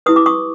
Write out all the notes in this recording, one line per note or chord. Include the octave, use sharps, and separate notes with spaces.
E4 G4 B4 D#6
D6
C#6 D#6